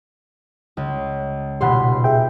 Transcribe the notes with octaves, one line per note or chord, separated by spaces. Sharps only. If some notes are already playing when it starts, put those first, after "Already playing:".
C#2
D#1 B2 G4 F#5 B5 C6
G#4 E5 G5